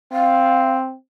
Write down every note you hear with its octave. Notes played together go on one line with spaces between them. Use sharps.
C4 F5